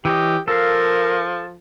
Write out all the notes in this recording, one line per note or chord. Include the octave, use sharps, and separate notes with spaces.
E3 G4 C#5 D#5
F3 A4 A#4 F5